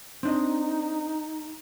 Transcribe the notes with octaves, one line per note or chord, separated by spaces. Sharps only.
C4 D4 D#4 D#5